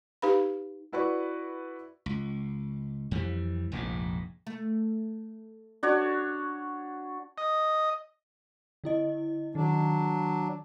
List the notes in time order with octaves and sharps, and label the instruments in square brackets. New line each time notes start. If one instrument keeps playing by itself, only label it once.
[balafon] D#4 G4 B4 F5 B5
[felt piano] E4 F#4 B4 D5 C#6
[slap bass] C#2
F2 E3 G3
F1 A#1 G#2
[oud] A3
[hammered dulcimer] D4 F#4 C#5
[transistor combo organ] D#5
[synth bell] D3 E4 D#5
[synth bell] D#3 [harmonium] F#3 D4